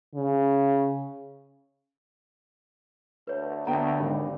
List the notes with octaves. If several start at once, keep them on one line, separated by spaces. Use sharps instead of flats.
C#3
D2 B4 C#5
D2 D3 B3 G5 A#5
G#1 D#2